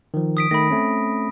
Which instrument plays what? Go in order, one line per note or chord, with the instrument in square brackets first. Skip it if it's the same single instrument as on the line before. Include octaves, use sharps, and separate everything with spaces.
[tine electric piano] D#3 F3
[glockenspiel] D#6 B6 D7
[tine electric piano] D#3 A3 [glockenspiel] B5 A#6
[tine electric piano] A3 C4 C#4